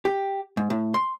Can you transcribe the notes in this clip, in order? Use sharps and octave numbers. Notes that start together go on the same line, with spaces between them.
G4
G#2
A2
C6